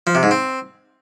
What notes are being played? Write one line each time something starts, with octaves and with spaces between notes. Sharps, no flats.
F3
C3
G#2
C4